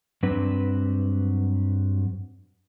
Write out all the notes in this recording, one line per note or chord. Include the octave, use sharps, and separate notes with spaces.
G2 F#3 C4 D4 B4